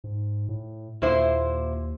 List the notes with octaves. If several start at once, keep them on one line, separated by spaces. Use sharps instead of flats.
G#2
A2
D#2 A#2 E4 C5